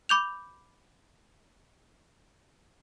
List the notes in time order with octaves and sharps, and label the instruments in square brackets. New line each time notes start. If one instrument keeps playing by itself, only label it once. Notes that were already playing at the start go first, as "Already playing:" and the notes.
[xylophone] B5 D6 G6 F7